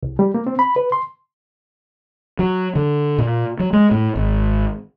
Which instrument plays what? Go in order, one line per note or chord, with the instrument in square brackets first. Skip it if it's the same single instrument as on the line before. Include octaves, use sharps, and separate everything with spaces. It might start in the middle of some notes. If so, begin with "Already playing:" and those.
[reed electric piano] C2
G3
A#3
C4
B5
B4
C6
[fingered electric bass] F#3
D3
A#2
F#3
G#3
A2
G#1